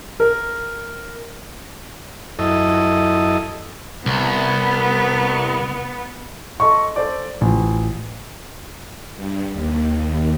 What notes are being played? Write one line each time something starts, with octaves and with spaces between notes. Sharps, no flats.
A#4
F#2 E4 A4 D#5
C2 B3
A4 D#5 C6 C#6
A4 C5 D5
A1 F3
G2
D#2